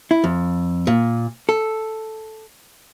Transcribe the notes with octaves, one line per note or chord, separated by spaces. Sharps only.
E4
F2
A#2
A4